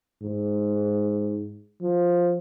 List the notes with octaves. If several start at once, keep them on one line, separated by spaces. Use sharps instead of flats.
G#2
F3